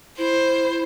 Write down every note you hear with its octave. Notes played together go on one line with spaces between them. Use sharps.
E4 C5